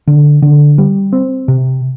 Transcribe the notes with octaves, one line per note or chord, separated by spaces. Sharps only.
D3
D3
G3
C4
C3